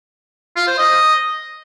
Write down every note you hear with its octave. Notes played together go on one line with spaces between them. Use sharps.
F4
C5
D#5